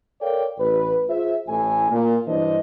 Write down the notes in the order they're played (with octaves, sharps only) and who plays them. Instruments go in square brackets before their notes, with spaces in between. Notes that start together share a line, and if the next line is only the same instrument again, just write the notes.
[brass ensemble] A4 A#4 C#5 D5 F5 G5
A1 B4
F4 G#4 C5 E5
A1 A2 G#5
A#2
F#1 G2 E3 D4 C5 D#5